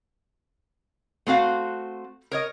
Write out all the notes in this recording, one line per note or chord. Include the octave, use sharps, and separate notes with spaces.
A3 C4 F#4 F5
A#4 C#5 D#5